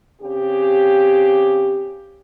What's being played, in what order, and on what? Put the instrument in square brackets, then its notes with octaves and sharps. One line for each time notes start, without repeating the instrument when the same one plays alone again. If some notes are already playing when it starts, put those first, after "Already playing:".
[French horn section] C#3 C4 G4